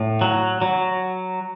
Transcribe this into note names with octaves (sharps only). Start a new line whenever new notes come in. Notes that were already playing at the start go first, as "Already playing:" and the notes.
Already playing: A2
F#3
F#3